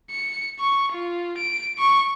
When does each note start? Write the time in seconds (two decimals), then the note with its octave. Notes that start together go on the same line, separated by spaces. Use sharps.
0.11 C#7
0.59 C#6
0.92 F4
1.38 D7
1.78 C#6